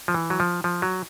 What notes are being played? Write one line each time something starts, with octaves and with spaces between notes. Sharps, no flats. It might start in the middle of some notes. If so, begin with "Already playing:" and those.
F3
E3
F#3
F3
F3
F#3